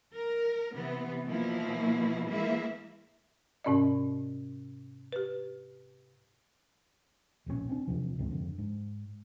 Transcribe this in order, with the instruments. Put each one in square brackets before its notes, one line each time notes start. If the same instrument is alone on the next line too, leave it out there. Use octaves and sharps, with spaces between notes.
[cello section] A#4
C3 E3 B3
B2 E3 F3 A#3 E4
E3 G#3 A#3 E4 E5
[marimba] G#2 C3 C#4 D5 D#5
G4 B4
[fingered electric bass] E1 A#1 G#2 C#4
C4 D4
E2 C3 F3
C#2 G#2 C3 D#3
F2 D3
G#2